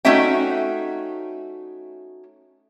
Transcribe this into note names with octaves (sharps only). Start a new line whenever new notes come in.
A3 C#4 D#4 F#4 E5 G5